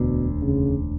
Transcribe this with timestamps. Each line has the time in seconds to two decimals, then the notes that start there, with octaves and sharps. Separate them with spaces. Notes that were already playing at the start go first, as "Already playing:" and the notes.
Already playing: E1 D2 B2 D3
0.42 C#3